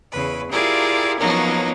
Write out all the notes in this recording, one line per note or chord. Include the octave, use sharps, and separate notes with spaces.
E2 C#3 B4
E4 F4 G4 G#4 A#4 D5
F3 F#3 A#3 B3 C#4 D#4